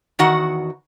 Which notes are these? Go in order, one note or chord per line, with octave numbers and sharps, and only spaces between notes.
E2 D#3 F#4 F#5